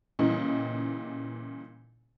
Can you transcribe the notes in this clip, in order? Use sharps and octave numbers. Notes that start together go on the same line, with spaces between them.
A#2 C#3 E3 G3 D#4